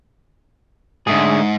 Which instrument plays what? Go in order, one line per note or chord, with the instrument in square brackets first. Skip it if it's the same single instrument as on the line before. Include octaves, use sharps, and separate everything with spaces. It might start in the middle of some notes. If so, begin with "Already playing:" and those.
[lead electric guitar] G#2 [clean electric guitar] D3 A3 G#4